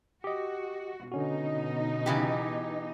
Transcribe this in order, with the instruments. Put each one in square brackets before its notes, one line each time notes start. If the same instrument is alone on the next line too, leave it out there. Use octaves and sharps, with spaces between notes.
[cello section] F#4 [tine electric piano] G4 D#5
[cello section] B2 D#4 [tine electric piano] D3 C#4 F#4
[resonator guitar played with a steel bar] C#3 E3 G4